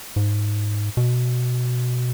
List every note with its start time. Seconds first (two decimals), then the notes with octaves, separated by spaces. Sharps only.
0.16 G#2
0.97 B2